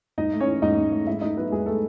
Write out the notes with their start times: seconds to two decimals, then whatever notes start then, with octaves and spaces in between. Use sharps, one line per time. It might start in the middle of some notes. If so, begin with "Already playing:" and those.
0.18 G#2 D#4 D#5
0.33 A3
0.40 C#4 C#5
0.47 E3
0.62 G#2 D#4 D#5
0.77 G#2
0.92 A3
1.07 G#2 E4 E5
1.21 A3 D#4 D#5
1.37 F#3 B3 B4
1.51 G#2 G#3 G#4
1.66 A3 A4